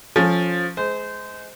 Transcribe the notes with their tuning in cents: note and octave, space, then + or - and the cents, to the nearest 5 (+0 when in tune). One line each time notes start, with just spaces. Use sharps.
F3 +5 C#4 -5 A4 -5
G#3 +20 C5 -25